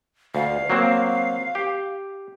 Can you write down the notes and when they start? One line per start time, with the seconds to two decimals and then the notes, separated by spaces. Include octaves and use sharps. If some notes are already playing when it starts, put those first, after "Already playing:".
0.35 D2 F5
0.70 F#3 A#3 C4
1.55 G4